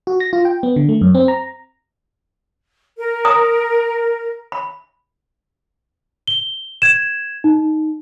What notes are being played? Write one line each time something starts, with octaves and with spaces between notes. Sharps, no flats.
F#4
A#6
F4
G5
B3
D3
A3
F#2
C4
A#5
A#4
A#5 D#6
B5
G7
G#6 E7
D#4